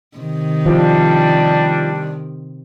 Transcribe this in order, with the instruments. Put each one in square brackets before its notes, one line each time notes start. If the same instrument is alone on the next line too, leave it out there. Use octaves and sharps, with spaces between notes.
[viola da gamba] C3 D#3
[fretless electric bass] F3 [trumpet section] G3 D4